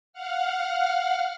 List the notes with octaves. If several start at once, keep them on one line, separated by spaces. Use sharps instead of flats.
F5 F#5 F6